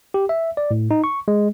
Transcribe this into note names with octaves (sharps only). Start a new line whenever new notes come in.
G4
E5
D5
A2
D#4
C#6
G#3